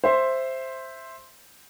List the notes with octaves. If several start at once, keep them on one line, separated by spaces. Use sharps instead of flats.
C5 E5 C6